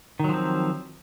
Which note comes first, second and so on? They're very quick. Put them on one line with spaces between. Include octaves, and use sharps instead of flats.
D#3 F#3 F3 C4